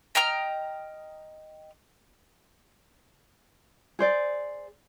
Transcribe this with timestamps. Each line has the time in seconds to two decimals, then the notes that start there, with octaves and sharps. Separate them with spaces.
0.15 D#5 G5 A#5 F6
3.99 G#4 C5 D5